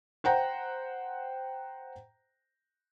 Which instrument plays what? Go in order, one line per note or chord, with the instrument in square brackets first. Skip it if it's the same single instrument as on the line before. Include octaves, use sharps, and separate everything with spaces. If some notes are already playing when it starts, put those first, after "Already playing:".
[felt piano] C5 F#5 G5 A#5